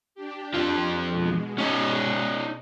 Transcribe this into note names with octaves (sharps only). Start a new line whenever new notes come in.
D4 G4
F2 F3
B2 G#3
C#4 D#4